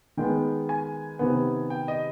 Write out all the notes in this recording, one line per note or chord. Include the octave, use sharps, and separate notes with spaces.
D#3 G#3 B3 G5
G#5
C3 D#3 B3
G5
D#5